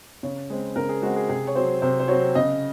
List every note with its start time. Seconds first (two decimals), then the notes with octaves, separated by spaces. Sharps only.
0.23 C#3 C#5
0.50 G#3 C4
0.76 C#3 A#4
0.89 G#4
1.02 G#3 C4 F#4
1.16 G#4
1.29 C3 G#4
1.47 C#5
1.55 F#3 C4 C5
1.82 C3 C5
2.00 C5
2.08 F#3 C4 C#5
2.35 C#3 D#5